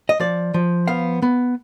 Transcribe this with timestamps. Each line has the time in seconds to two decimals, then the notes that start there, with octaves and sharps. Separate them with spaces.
0.09 D#5
0.20 F3 D5
0.54 F3
0.88 B3 F5
1.22 B3